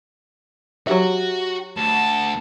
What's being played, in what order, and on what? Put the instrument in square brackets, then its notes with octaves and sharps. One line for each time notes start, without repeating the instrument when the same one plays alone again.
[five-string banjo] F#3 G4 E5 [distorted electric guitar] F#4
[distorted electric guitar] D2 [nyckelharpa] A5